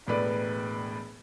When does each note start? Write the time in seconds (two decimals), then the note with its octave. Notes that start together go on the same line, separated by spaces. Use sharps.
0.07 E1 A2 B4 D5